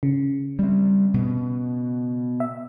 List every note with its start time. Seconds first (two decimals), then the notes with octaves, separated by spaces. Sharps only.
0.03 C#3
0.59 G3 C4
1.14 B2
2.40 E5